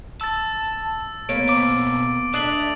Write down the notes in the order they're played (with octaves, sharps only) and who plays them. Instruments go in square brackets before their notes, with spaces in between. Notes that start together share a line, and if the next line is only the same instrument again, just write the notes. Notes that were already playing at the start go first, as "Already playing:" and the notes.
[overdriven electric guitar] A5 [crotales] E6 A6
[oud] A#3 B3 C#5 [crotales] D7
[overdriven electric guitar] B2 C4 [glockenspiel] D6
[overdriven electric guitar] A3 [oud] D4 [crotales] D#6 A6 F#7